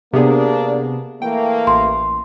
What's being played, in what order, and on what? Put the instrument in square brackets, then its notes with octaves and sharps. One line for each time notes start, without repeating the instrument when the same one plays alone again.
[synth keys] C3 B3 G#4 [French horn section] A#3 D4
[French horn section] E3 A3 A#3 [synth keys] G5
[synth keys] A1 [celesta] C6